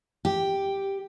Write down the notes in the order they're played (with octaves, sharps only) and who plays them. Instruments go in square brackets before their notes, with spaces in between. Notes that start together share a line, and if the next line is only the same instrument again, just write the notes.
[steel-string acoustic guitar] G4